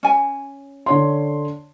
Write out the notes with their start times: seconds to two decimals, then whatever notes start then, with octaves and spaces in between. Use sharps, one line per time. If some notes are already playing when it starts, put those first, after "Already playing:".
0.03 C#4 G#5
0.86 D3 C#5 C6